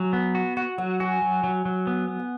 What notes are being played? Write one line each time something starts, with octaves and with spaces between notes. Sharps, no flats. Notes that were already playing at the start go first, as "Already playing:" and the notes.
Already playing: F#3 G#5
B3
F#4
F#4 F#5
F#3 F#5
F#4 G#5
F#3
F#3
F#3
B3
B3
F#5